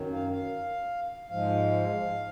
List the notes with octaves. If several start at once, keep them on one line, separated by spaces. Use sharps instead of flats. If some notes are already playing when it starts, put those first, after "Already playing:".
Already playing: F#2 D#3 F#3
F5
F5
G#2 F3 G#3 F5